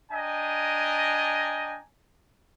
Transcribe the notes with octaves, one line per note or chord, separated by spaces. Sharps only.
D4 D#5 G5 G#5 A#5